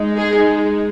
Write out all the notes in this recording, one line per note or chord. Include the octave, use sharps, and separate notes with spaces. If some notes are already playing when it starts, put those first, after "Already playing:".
Already playing: G#3 D#4
G#4